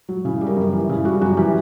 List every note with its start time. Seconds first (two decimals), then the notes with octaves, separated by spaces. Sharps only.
0.09 F#3
0.25 C#3 E4
0.41 G3
0.47 A#4
0.56 F#2
0.73 E3
0.89 C#3 E4
1.05 G3 F#4
1.21 F#2 F#4
1.37 E3 G4